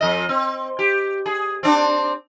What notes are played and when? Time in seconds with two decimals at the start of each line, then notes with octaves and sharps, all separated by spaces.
0.01 F2 D#5
0.29 C4
0.79 G4
1.26 G#4
1.63 C4 D4